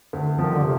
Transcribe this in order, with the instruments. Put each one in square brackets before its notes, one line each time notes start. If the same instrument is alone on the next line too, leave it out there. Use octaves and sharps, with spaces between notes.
[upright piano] D2
[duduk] D#3 [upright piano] F3
[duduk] D3
C3